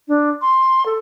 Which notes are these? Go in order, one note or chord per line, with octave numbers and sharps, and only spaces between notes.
D4
C6
A4